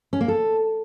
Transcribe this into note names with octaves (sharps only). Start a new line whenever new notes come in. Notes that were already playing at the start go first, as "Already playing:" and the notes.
C#4
A#3
A4